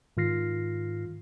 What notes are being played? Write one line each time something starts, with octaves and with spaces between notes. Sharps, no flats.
G#2 D#3 F4 F6 A#6 C7